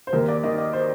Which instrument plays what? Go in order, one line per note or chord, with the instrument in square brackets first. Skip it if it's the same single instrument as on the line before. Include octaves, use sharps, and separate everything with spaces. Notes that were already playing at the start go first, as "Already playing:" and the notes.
[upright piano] C5
D#2 A#4
D5
D#3 D#5
D#5
C5